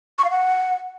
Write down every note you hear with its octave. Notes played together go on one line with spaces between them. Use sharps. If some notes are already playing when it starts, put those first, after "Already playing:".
C#6
F5
F#5